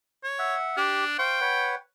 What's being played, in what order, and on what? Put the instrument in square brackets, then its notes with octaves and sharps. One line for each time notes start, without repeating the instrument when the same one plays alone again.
[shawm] C#5
[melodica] E5 F#5
[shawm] D4 [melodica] G4
[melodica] C5 F5 C#6 [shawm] G5
[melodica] B4 C#5 F#5